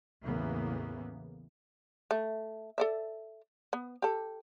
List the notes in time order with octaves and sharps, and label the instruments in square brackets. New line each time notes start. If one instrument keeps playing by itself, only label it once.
[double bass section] A1 E2 C#3 E3 A#3 B3
[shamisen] A3
A4 D5 E5
B3
G4 A4